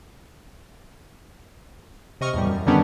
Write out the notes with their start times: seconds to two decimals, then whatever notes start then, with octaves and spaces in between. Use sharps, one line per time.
2.21 C3 D#5 C#6 F6
2.34 E2 A2 G3
2.47 F#2
2.67 D3 D#3 G3 B3 C#4 D4